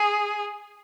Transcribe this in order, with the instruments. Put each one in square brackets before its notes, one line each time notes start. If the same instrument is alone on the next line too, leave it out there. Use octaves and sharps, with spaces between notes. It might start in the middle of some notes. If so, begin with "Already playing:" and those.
Already playing: [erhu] G#4